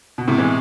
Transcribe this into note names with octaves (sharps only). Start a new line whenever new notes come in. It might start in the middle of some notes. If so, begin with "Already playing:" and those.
B2
A2 C3
E3 G#3